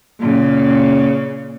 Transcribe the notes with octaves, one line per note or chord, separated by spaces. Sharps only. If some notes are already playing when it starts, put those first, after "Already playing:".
A#2 C#3